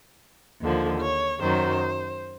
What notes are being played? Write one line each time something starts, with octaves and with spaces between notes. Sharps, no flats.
D#2 D3 F3
C#5
F#2 D#3 F#3 C5